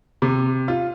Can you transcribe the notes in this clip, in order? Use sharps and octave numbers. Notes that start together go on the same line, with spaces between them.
C3
F4